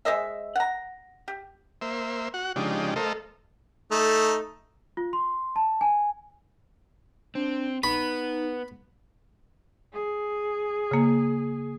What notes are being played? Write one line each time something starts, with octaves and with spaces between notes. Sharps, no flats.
G#3 C5 D#5 E5
F#5 A#5
G4
A#3 C5 E5
F#4 F#5
C#3 F3 G#3 D4 D#4 G4
A3 A4 A#4 C5 D#5 F5
A3 D#4
F4
C6
A5
G#5
C4 D4
B3 D#4 B5
G#4
C#3 A#3